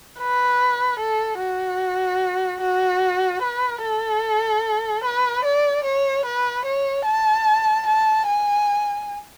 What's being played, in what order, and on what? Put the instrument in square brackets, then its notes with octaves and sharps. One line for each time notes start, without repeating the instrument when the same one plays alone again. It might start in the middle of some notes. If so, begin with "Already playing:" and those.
[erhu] B4
A4
F#4
F#4
B4
A4
B4
D5
C#5
B4
C#5
A5
A5
G#5